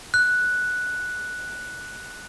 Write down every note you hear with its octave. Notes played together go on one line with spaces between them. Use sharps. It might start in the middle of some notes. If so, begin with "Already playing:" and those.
F#6